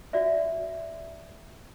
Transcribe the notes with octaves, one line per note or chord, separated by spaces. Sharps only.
F#4 D5 E5